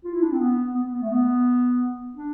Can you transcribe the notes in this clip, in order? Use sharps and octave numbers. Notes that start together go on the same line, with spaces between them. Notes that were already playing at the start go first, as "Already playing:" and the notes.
F4
E4
D4
C4
B3
B3
B3
A3
B3
D4